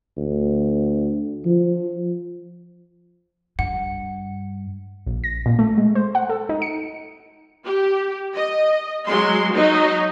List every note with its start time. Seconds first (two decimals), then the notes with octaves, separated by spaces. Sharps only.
0.17 D2
1.46 F3
3.59 G2 F#5
5.07 A#1
5.24 A#6
5.46 A#2
5.59 A3
5.78 G#3
5.95 C5
6.15 F#5
6.29 A4
6.49 D#4
6.62 C#7
7.65 G4
8.35 D#5
9.07 F#3 G#3 C6
9.54 F#3 D#4 D#5